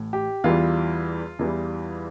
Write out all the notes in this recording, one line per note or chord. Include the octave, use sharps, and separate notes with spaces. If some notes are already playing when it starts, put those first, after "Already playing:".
Already playing: A1 A2
G4
E2 E3 G3 F4
E2 E3 G3